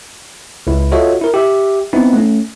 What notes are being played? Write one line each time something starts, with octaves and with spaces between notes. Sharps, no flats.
C#2 E4
F4 F#4 A4 C#5 D#5 E5
E4 A#4
G4 E5
B3 C4 D#4 E4
A3 C#4